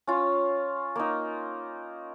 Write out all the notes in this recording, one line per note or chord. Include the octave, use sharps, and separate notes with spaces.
C#4 F4
A#3 D#4